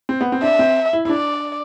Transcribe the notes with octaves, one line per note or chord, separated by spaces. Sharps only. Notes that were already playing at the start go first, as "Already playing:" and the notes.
C4
B3
C4
D4 E5
C4
E4
E4
D4 D5